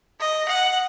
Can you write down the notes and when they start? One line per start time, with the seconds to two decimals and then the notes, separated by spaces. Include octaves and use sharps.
0.20 D#5
0.48 F#5